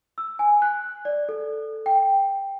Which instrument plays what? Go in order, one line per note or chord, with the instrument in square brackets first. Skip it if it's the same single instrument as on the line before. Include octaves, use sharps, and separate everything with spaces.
[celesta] E6
G#5
F#6
D5
A4
G5